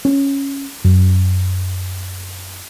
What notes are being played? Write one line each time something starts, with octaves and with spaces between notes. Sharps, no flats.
C#4
F#2